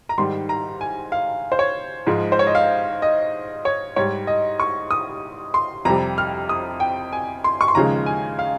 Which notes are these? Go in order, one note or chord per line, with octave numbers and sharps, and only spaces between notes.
A#5
G#2 D#3 G3 C6
A#5
G#5
F5
C5
C#5
G#2 F3 G#3
C5
C#5
D#5
F5
D#5
C#5
G#2 G3 C#5
D#5
C#6
D#6
C6
F2 C3 G3 A#5
F6
D#6
G5
G#5
C6
C#6
C6
D#2 C#3 F3 G#3 A#5
G#5
F5